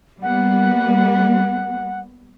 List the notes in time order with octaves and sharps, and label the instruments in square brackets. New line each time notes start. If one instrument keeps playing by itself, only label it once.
[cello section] G3 A#3 B3 [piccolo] F#5